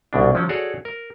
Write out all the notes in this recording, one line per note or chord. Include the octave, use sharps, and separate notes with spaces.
C2 B2 D4
F3 F#3 C#4
F#4 G#4 A4 C#5 D5
A#4